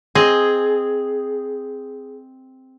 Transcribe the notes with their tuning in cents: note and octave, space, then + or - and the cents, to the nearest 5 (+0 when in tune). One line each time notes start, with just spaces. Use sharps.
C4 +0 G#4 +0 D#5 +0